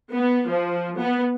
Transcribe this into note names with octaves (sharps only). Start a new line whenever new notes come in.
B3
F3
B3